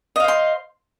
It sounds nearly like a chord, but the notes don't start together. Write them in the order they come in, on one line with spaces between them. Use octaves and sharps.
D#5 F5 C5 C6